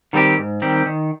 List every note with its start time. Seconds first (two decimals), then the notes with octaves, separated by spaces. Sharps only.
0.13 D#3 G3 C4 G4
0.38 G#2
0.62 D#3 G3 C4 G4
0.86 D#3